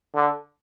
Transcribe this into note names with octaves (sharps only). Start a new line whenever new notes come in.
D3